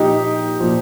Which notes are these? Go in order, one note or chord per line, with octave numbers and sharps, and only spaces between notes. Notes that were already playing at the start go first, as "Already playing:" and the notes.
Already playing: A#2 F3 D#4 G4
A#2 F3